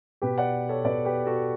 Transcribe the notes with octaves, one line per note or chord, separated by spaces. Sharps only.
B2 G4 B4
D5 F#5
A4 C#5
B2 B4 D5
G4 B4
F#4 A4